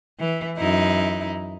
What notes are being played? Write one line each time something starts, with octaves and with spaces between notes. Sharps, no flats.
E3
F#2 D#4 E4